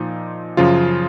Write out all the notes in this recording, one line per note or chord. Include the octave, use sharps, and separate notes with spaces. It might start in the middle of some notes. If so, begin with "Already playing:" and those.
Already playing: A#2 F3 D#4
F#2 C#3 F3 F4